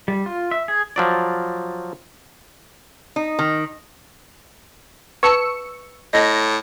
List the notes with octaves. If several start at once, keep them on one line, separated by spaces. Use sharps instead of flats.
G3
F4
E5
G#4
F3 F#3 D5
D#4
D#3
B4 A5 C#6 E6 C#7
A2 D#5 A#6